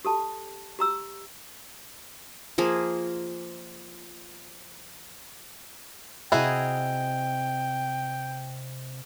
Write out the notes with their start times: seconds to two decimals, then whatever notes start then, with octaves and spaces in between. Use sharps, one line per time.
0.05 G4 A4 A5
0.79 G4 A#5 E6
2.58 F3 A#3 G#4
6.32 C3 E4 F#4 G#4 D#5 G5 A#5